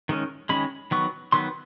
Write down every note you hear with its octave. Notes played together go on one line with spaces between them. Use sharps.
D#3 G#3 C#4
D#3 G#3 C#4 B5
D#3 F#3 B3 C#6
D#3 F#3 B3 C6